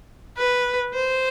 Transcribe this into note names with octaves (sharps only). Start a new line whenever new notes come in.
B4
C5